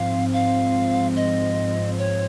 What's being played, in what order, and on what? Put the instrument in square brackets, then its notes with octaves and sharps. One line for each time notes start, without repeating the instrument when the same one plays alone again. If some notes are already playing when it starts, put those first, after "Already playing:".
Already playing: [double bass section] G#2 F3 C4 [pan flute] F5
[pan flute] F5
D#5
C#5